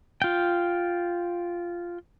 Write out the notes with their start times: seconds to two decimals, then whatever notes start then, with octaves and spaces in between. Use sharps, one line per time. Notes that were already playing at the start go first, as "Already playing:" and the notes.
0.22 F4 G5